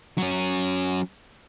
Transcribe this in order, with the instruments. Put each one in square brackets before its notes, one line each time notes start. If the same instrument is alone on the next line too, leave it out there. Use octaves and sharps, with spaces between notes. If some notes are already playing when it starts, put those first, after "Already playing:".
[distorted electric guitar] F#3 C#4